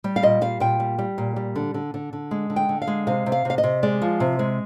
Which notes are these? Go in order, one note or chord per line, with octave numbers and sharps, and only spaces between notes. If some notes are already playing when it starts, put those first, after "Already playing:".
G3
F5
A#2 D#5
G3 F5
A#2 G5
G3
G3
A#2
G3
D3
D3
D3
D3
G#3
D3
G5
D3
F5
G#3
C3 F5
C3
F5
C3 F5
D#5
C3
G#3 D5
F3
C3
G#3